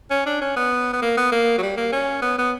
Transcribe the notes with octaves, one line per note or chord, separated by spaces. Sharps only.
C#4
D4
C#4
B3
B3
A#3
B3
A#3
F#3
G3
A#3
C#4
B3
B3